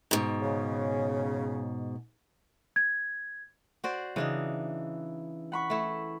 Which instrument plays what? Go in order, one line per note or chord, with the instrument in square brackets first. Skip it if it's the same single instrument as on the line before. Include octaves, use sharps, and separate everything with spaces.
[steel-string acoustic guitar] G#2 B2
[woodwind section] C#3
[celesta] G#6
[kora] F#4 C5 D5
[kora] C#3 D4 D#4 [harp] E3
[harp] F#5 B5 C#6
[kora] A3 E4